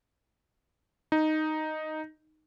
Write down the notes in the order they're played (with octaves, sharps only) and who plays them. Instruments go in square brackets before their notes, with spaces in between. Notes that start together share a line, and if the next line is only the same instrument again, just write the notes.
[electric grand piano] D#4